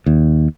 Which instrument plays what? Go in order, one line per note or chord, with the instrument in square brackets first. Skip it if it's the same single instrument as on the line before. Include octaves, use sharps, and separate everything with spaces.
[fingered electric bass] D#2